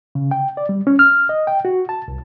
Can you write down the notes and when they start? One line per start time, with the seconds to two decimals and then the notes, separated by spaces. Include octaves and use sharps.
0.15 C#3
0.31 G5
0.57 D5
0.69 G3
0.87 C#4
0.99 F6
1.29 D#5
1.47 G5
1.65 F#4
1.89 A5
2.08 C2